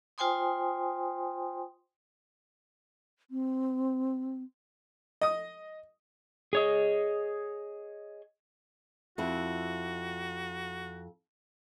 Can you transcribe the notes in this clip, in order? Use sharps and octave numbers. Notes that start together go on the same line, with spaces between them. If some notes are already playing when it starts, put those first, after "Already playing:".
F4 C5 G5 G#5 C6 D#6
C4
D#5 D#6
G#4 C#5 D#5
F2 E4 F#4